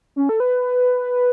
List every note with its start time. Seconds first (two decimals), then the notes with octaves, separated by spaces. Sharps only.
0.16 C#4
0.29 A4
0.40 B4